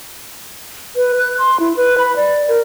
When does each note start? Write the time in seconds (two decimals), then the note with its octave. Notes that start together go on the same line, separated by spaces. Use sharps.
0.96 B4
1.18 F#6
1.38 C6
1.60 E4
1.77 B4
1.98 B5
2.16 D5
2.49 A#4